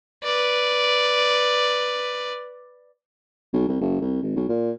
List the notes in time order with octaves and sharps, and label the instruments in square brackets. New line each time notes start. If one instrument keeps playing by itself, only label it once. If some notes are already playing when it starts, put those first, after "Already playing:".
[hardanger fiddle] B4 D5
[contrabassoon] B1
C2
F#1
C2
G#1
B1
A#2